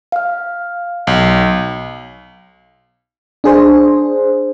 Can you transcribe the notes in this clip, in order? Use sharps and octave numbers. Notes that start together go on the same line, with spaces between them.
F5 F6
B1
D4 G#4 C5